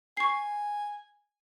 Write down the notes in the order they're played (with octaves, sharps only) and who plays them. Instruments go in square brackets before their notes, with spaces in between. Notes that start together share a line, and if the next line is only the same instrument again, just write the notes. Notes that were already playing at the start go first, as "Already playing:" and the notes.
[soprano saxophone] G#5 [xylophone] C#6 C7